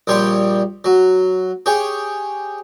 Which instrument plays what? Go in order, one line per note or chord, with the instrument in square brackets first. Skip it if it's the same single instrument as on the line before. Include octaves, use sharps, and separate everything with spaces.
[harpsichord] A#1 G3 G4 C#5 C6
F#3
G4 G#4 C#5